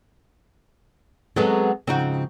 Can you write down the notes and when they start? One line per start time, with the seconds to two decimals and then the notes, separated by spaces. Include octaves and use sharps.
1.36 F#3 G#3 B3 C4 G#4 A4
1.87 G#2 C#3 F3 C4 D#4 F#4